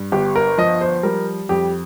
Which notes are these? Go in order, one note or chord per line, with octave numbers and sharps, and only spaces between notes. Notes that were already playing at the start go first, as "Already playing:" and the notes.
Already playing: G2
G1 G4
A#4
F3 D#5
C5
G3 A#4
F2 G4